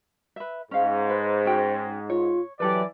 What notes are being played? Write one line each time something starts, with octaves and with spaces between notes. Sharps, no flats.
B4 E5
G#2 C#4 F5
B4 C5
C#4 F#4 G5
F4 C#5
E3 F#3 G4 A4 B4 D5